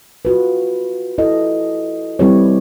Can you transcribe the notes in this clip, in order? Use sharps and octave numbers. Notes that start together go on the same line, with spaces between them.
F4 F#4 B4
E4 A4 D#5
G3 C4 E4 G4 B4 C#5